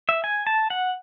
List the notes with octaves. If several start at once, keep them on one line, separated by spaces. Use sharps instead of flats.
E5
G#5
A5
F#5